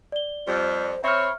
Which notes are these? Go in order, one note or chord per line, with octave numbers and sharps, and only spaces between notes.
D5 G7
F2 G3 C5
C4 C#5 E5 B5 F6